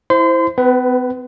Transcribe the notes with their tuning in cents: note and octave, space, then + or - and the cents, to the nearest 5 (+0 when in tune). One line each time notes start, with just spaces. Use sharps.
E4 +0 C5 +0 C6 -35
B3 +45 B4 +5